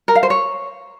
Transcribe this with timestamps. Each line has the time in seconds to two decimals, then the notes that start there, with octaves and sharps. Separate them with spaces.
0.08 A#4
0.15 F5
0.23 C5
0.30 C#5